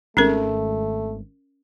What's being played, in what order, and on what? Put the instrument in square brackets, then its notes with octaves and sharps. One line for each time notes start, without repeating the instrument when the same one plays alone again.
[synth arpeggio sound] G#1 [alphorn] A3 [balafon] C#4 G#4 A#4